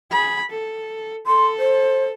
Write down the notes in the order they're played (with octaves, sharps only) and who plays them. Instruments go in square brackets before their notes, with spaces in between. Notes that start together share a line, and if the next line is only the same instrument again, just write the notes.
[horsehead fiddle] G#4 B5
A4
[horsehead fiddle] A4 [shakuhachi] C6
[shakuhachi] C5